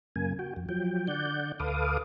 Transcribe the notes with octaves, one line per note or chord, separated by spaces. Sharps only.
F#2 C#3 A#3 G#5
F#4 G5
F2
F3 F#3 G5
D3 D5 F#5 G6
D2 A4 B4 F5 D6 D#6